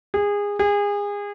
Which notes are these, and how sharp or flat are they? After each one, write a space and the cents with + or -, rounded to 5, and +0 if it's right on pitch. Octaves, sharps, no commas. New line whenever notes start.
G#4 -25
G#4 -30